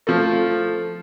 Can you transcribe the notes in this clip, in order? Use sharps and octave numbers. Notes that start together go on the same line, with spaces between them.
F3 A3